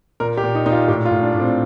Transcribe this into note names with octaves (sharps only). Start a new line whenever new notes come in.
A#2 A#4
G4
A#2
D#4
A#2 D#4
F4
A2 G4
F4
A2
D4
A2
C4